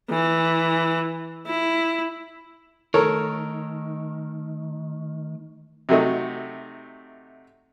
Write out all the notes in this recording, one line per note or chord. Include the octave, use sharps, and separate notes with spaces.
E3
E4
D#3 A3 D#4 A4 A#4 C#5
C3 F#3 A3 D#4